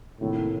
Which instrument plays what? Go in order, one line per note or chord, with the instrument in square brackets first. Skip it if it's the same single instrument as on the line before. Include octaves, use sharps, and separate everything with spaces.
[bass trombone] A2 [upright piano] C3 D#3 A#3 F4